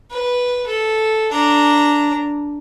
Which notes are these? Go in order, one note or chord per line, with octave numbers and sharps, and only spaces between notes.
B4
A4
D4 A#5